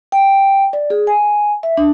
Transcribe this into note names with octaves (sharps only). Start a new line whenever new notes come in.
G5
D5
G#4
G#5
E5
D4